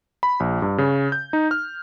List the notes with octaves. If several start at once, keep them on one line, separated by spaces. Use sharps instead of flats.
B5
A#1
G2
C#3
G6
D#4
F6